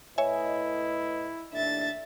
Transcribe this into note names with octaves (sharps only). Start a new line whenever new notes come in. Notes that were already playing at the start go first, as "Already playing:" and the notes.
A2 E4 B4 C#5 D#5 E5 G#5
D#2 A2 D4 E5 A6